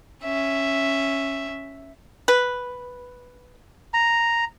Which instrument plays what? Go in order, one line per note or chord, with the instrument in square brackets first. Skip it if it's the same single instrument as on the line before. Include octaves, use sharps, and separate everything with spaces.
[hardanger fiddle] C#4 E5
[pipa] B4
[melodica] A#5